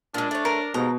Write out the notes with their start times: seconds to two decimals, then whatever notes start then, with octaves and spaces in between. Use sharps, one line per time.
0.14 A#2 G#3 D4
0.31 A3 C#4
0.45 A#4
0.74 D#2 G#2 B2 A#5